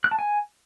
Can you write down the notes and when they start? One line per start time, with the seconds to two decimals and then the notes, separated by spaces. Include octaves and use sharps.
0.04 F#6
0.11 A5
0.19 G#5